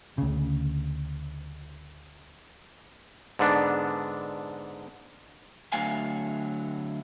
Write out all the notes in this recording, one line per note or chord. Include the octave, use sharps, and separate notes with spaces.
D2 C#3
G#2 D3 B3 D4
D3 F#3 A3 F5 G#5